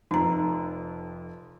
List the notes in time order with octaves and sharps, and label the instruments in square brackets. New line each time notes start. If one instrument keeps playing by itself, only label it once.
[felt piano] F1 F2 [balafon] D#4 A#5